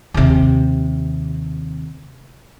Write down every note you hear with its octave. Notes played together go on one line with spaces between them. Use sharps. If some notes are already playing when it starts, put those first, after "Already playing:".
D#2 C3